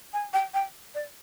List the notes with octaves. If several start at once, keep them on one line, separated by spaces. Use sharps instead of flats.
G#5
G5
G5
D5